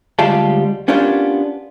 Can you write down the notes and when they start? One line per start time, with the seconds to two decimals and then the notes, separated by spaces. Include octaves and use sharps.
0.19 D2 G3 G#3 F4 G4 A5
0.88 B3 C#4 D4 F4 G4 A#4